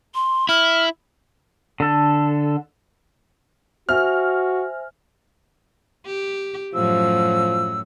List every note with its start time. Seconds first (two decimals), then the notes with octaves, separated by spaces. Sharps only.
0.15 C6
0.49 E4 F6
1.80 D3 A4
3.89 F#4 C5 E5 G#5 F6
6.06 G4
6.74 F#2 A2 F3 F#3 E6